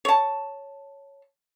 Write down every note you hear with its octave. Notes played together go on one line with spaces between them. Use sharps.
C#5 A5